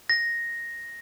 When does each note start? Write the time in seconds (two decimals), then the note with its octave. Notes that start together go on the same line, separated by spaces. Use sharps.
0.10 A#6